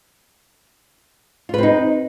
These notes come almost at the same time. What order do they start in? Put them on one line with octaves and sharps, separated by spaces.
F4 B4 C4 D#4